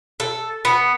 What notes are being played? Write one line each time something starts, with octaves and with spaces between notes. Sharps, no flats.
A4
B3